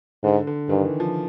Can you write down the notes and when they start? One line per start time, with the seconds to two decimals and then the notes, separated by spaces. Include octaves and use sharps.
0.23 G#2 D3
0.47 D3
0.69 G2 D#3
0.85 E3
1.00 F3